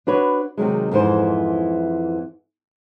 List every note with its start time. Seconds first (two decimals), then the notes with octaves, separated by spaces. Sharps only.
0.07 D4 F#4 B4 C#5
0.57 C3 D#3 F#3 G#3
0.92 F2 G#2 E3 C5